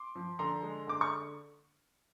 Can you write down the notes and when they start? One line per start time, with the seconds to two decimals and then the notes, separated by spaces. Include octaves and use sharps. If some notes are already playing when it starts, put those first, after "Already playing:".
Already playing: C6 D6
0.15 F3
0.39 D3 A#5 C6
0.63 G#3
0.87 D3 D6
1.01 C#6